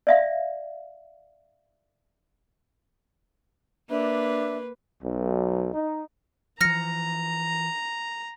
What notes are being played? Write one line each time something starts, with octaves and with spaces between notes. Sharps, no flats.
D5 E5 F5
A#3 D4 B4 E5
B1
D#4
E3 F3 A#5 F6 A#6 C#7